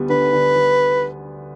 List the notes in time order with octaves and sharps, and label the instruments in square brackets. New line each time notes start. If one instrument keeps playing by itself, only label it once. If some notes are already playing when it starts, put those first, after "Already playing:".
Already playing: [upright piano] D2 G3 B3
[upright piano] D3 [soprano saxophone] B4
[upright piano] D3
G3